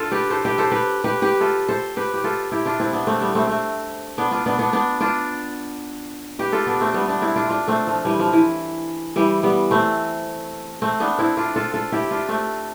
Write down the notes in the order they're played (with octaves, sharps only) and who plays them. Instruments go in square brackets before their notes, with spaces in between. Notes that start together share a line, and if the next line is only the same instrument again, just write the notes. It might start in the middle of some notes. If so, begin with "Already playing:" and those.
Already playing: [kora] D4 F4 A4
G4 B4
A4 C5
G4 B4
A4 C5
G4 B4
G4 B4
G4 B4
F4 A4
A4 C5
G4 B4
G4
F4 A4
E4 G4
D4 F4
C4 E4
B3 D4
A3 C4
G3 B3
A3 C4
A3 C4
B3 D4
D4 F4
B3 D4
B3 D4
B3 D4
D4 F4
G4 B4
F4 A4
B3 D4
A3 C4
G3 B3
B3 D4
C4 E4
D4 F4
D4 F4
A3 C4
F3
E3 G3
F3
E3
E3 G3
G3 B3
A3 C4
A3 C4
B3 D4
C4 E4
D4 F4
F4 A4
F4 A4
E4 G4
D4 F4
A3 C4